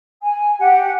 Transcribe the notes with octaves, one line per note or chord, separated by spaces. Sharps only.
G#5
G4 F#5